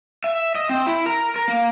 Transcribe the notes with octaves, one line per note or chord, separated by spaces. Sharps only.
E5
D#5
C4
E4
A#4
A#4
A#3